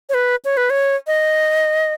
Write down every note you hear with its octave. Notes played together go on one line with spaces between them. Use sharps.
C#5
B4
C#5
B4
C#5
D#5